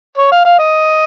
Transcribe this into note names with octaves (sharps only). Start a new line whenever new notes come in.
C#5
F5
F5
D#5